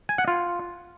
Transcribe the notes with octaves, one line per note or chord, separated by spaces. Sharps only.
G#5
F#5
F4